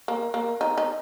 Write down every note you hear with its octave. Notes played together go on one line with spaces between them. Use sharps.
A#3
A#3
D#4
D#4